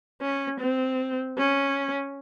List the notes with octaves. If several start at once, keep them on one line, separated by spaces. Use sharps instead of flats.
C#4
C4
C#4